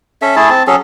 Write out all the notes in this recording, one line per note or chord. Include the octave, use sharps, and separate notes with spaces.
C#4 A4 E5
A3 E4 G#4 A5
C4 A5
F#3 C#4 G#4 A4